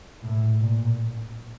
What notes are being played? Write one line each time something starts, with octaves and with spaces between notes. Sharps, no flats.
A2
A#2